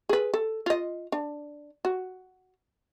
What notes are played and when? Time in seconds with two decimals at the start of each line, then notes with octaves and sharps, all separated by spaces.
0.09 G#4 B4
0.34 A4
0.66 F4 D#5
1.12 D4
1.85 F#4